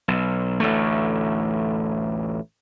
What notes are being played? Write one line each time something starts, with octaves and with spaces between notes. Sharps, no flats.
B1
A1 D2 A3